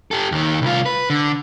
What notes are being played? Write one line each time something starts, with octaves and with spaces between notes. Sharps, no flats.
G4 A4
D#2 D#3
C2 F4
B4
D3